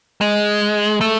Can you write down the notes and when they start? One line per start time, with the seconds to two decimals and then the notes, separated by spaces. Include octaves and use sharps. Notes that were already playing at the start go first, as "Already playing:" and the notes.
0.21 G#3
1.01 A3